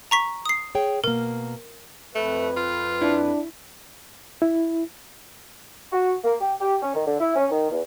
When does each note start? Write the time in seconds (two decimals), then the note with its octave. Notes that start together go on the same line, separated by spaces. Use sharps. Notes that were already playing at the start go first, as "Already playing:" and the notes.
0.11 A#5 C#6 B6
0.46 D#6 C7
0.75 G#4 C#5 G5
1.04 B2 A#3 A#4
2.15 F2 A3 B4
2.57 F4
3.02 D4 E4
4.42 E4
5.92 F#4
6.25 A#3
6.41 G4
6.61 G4
6.82 C#4
6.94 D#3
7.07 D3
7.20 E4
7.36 C#4
7.51 D#3
7.71 E2